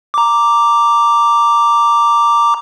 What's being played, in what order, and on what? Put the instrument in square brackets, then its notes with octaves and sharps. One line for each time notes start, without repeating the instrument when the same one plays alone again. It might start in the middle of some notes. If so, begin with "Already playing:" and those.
[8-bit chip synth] A#5 D6